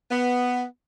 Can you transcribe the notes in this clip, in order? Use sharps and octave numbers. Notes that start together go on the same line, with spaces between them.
B3